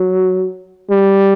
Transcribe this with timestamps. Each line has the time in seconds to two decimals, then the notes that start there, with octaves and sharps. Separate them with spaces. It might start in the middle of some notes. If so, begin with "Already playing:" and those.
Already playing: F#3
0.90 G3